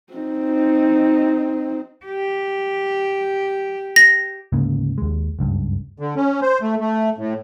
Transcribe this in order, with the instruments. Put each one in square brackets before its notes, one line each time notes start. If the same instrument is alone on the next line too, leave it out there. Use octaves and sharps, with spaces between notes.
[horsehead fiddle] C4 D#4
[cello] G4
[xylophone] A#6
[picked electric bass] D2 G#2 C#3 A#3
D#2 G#3
F#1 C#2 G2
[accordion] D3
C#4
C5
A3
A3
A2